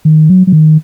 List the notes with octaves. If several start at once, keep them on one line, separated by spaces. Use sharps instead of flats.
D#3
F#3
F#3
D#3